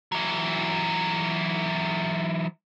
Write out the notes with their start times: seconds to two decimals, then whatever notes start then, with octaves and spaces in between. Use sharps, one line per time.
0.12 E3 F#3